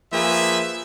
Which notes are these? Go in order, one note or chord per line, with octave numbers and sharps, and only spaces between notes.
F3 A#3 G#4 B4 E5